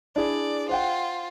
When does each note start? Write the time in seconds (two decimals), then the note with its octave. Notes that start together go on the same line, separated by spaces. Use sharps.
0.16 D4 E4 G#4 D5
0.69 F4 C5 F#5 G5